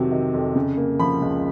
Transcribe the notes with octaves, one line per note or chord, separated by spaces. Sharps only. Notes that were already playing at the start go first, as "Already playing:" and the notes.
Already playing: F2 C3 D#3 F#3
D#3
F2
C#3
A#3
F3 B5
C#2